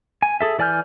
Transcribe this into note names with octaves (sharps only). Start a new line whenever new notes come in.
G#5
G#4 A4 E5
E3 D5 G#5 F6 G6